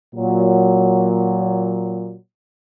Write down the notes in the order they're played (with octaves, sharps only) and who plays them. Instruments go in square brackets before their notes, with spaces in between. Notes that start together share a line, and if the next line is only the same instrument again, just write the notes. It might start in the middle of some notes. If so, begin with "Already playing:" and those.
[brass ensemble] A#2 F#3